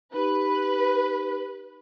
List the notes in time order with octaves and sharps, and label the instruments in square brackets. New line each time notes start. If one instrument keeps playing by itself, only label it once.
[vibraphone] D#4 G4 B5 [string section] B4